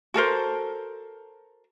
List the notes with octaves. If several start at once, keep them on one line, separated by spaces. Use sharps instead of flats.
F#4 A4 A#4 C5